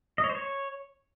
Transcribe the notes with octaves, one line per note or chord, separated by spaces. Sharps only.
D#5
C#5
C5
C#5